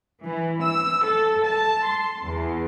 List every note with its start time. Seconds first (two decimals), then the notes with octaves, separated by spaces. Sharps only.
0.22 E3
0.60 E6
1.04 A4
1.44 A5
1.84 C6
2.21 E2